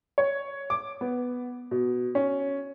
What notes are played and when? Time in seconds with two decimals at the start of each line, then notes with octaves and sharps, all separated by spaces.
0.18 C#5
0.70 D6
1.01 B3
1.71 B2
2.15 C#4